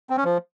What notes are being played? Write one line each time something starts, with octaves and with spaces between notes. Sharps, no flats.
C4
C#4
F3